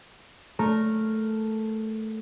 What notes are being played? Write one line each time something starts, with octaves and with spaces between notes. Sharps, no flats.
A3 A#4